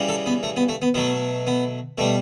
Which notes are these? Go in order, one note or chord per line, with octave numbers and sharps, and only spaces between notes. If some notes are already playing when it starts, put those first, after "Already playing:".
Already playing: C#3 E3 G3
A4
B3
A3
B3
A3
B3
B2 F#3 A3 B3
B3
B2 G3 A3